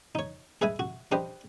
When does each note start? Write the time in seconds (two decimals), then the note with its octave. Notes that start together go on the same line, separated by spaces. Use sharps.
0.15 D#4 C#5
0.62 G#4 B4 D#5 E5 G#5
0.79 F#4
1.12 D4 G4 B4 C5 D#5